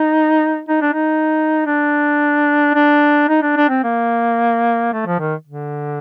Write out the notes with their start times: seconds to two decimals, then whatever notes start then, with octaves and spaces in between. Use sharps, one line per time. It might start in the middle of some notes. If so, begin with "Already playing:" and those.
Already playing: D#4
0.69 D#4
0.82 D4
0.93 D#4
1.66 D4
2.75 D4
3.29 D#4
3.42 D4
3.57 D4
3.70 C4
3.84 A#3
4.93 A3
5.06 F3
5.20 D#3
5.47 D3